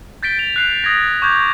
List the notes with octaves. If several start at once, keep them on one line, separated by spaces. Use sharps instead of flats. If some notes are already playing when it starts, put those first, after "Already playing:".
G6 A6 B6 D7 G7
F7
F#6 C7 F7
D#6 G#6 A#6
C#6 D6 G6 G#6